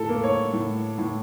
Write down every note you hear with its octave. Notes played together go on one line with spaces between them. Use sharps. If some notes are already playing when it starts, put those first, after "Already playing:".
Already playing: A2 A4
A#3
C#5
A2
A2